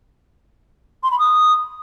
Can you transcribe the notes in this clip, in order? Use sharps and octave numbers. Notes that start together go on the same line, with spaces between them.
C6
B5
D#6